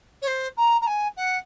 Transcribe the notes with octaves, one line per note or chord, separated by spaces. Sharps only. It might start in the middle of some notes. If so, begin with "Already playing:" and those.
C#5
C5
A#5
A#5
G#5
F#5